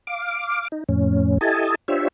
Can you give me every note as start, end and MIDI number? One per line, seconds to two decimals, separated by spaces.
0.07 0.68 77
0.07 0.68 86
0.72 0.84 63
0.89 1.38 41
0.89 1.38 45
0.89 1.38 61
1.41 1.75 64
1.41 1.75 67
1.41 1.75 69
1.41 1.75 75
1.41 1.75 80
1.41 1.75 81
1.88 2.08 62
1.88 2.08 65
1.88 2.08 67
1.88 2.08 72
1.88 2.08 73
1.88 2.08 76